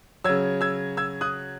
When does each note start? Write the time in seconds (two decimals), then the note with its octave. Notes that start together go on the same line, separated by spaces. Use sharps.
0.24 C#3 F#3 E6 G#6
0.61 E6 G#6
0.97 E6 G#6
1.21 D#6 F#6